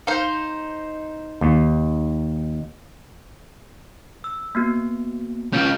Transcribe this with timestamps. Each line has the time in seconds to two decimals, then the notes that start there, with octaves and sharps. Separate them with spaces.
0.07 D#4 C5 F5
1.41 D#2
4.24 E6
4.55 A#3 B3 F#4
5.53 C#4 F4 F6 G6